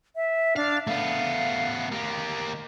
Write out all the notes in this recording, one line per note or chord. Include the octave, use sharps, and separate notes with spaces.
E5
D4 F5
A3 B3 F5
A#3 G4